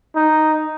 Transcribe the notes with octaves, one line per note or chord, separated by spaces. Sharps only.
D#4